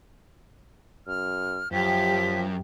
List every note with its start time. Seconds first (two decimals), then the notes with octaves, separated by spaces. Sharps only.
1.07 F#2 F6
1.72 F#2 F3 G4 B6